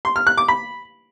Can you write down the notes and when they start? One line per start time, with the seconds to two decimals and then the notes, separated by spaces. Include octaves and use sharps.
0.05 C6
0.16 F6
0.27 F#6
0.38 D6
0.48 B5